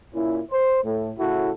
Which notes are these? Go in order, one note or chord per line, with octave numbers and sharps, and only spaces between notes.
A#2 C#4 E4
C5
A2
A2 C#3 E4 F#4 A4